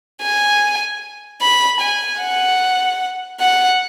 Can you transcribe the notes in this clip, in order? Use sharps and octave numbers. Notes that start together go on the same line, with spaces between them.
G#5
B5
G#5
F#5
F#5